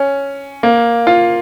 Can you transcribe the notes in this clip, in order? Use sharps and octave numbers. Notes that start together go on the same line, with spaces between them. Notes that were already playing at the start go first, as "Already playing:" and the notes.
Already playing: C#4
A#3
F4